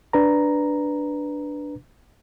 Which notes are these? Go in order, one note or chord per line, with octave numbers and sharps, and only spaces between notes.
D4 B4 A#5